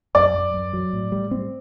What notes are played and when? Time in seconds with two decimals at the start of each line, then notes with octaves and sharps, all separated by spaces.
0.15 F#2 D5 D6
0.34 F#2
0.54 F#2
0.73 F#3
0.93 A2
1.12 G3
1.31 C4